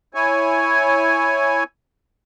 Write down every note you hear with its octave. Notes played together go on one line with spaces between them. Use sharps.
E4 C#5 G#5